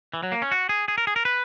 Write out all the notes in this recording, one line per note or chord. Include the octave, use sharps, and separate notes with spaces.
E3
F#3
A#3
C#4
F#4
G#4
G#4
A#4
G#4
A#4
B4